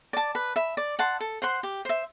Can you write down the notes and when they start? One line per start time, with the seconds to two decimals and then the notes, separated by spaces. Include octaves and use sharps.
0.13 D5 A5
0.35 B4
0.56 E5 B5
0.77 D5
0.99 F#5 A5 C6
1.20 A4
1.42 C5 F#5 C6
1.63 G4
1.85 C5 E5